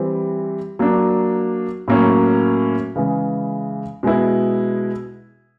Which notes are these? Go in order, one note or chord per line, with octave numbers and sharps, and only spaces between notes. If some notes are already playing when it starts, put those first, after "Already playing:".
Already playing: E3 G3 C4
F#3 A#3 D4
A2 F#3 A#3 C#4
C#3 E3 G#3
B2 G#3 B3 E4